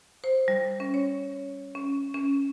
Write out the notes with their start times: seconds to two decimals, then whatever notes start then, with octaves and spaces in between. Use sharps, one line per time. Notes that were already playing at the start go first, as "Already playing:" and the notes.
0.24 C5
0.48 G3
0.80 C#4
0.94 C#5
1.75 C#4
2.14 C#4